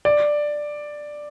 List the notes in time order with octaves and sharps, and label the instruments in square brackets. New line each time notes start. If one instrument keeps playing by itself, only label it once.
[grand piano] D5